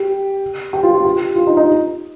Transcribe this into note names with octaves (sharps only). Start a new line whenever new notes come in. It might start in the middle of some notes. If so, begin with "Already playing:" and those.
Already playing: G4
G4
F4
F4
G4
F4
D#4
D#4